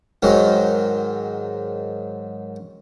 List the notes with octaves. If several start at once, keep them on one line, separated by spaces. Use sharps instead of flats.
G#2 D#3 F#3